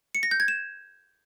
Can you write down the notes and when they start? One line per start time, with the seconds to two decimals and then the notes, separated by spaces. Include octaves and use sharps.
0.15 C#7
0.23 A#6
0.31 G6
0.40 G#6
0.48 E7